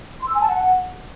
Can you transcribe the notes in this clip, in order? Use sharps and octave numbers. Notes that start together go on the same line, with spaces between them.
C6
E6
G#5
A5
F#5